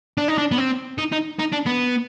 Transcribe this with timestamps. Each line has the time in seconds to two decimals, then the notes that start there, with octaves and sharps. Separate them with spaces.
0.18 D4
0.28 D#4
0.38 D4
0.51 B3
0.58 C4
0.98 D#4
1.12 D#4
1.39 D#4
1.53 D4
1.66 B3